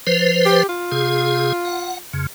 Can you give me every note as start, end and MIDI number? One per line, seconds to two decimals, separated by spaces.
0.07 0.63 53
0.07 0.63 71
0.07 0.63 72
0.45 0.67 67
0.69 2.01 65
0.92 1.53 48
0.92 1.53 68
1.65 1.98 78
2.13 2.26 41
2.13 2.26 49